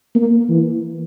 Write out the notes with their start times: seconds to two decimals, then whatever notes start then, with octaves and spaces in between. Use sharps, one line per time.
0.15 A#3
0.49 E3